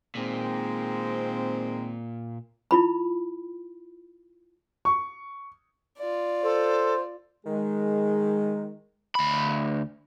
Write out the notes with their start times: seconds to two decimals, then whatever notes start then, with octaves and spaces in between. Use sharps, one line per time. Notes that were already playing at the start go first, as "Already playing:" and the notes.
0.15 A#2 D#3 G#3 C4
2.71 E4 F4 B5
4.85 C#6
5.98 F4 D5
6.43 A4 C5
7.46 D#3 G#3 G#4
9.15 D2 B5